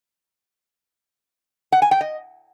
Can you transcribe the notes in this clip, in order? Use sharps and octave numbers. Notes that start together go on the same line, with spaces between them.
F#5
G#5
G5
D#5